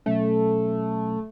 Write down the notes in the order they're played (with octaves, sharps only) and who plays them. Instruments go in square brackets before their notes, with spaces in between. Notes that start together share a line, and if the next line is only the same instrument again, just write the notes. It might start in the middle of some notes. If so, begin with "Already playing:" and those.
[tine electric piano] B2 F#3 C#4 [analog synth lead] A3